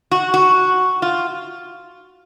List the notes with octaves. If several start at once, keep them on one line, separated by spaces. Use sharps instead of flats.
F#4
F#4
F4